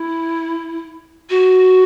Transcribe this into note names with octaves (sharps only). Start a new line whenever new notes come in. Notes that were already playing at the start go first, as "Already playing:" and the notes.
Already playing: E4
F#4